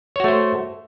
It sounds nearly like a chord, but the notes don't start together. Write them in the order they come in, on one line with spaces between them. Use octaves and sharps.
C#5 F#4 A3 C5